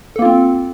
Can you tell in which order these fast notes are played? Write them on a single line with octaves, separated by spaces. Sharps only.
A4 A#3 F4 C4